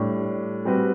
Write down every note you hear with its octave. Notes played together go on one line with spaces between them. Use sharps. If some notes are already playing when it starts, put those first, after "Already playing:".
Already playing: A2 G3 D4
G3 C4 F#4 B4